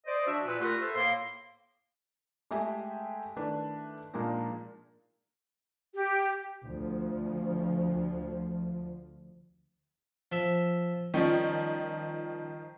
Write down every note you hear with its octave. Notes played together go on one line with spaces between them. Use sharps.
C5 D5 D#5
F3 D4 F#4 D5 E5
A#2 B4
A3 F4 G4 A#4 B4 F#5
A4 C5 E5
A2 A#3 C6
G#3 A3 G4 E5 G5 G#5
D#3 A3 D4 E4 B4
A#2 F3 G#3 A#3 D4 D#4
G4
D2 F3
F3 E5
D#3 F3 G3 C#4